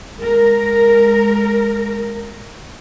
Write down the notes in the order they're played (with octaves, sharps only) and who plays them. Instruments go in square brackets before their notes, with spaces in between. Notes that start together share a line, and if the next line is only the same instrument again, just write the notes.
[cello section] G#3 A#4